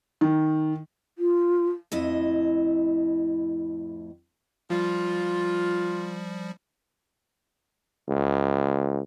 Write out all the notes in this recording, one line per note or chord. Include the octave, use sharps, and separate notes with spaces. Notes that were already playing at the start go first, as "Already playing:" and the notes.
D#3
F4
F2 A2 E4 D#5
F3 G3 F4
C#2